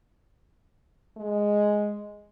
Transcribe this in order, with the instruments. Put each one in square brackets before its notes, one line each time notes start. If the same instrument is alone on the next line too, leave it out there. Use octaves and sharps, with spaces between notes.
[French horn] G#3